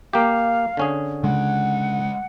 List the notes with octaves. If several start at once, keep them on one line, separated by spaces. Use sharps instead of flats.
A#3 G4 F5
D3 C#4 G#4
C#3 G#3 F#5